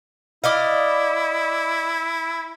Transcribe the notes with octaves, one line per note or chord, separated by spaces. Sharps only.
E4 D5 D#5 F5